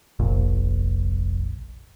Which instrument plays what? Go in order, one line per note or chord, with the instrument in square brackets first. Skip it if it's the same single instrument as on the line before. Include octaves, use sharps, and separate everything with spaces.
[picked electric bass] F1 A#1